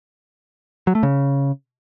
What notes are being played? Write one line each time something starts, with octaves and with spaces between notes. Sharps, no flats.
F#3
A3
C#3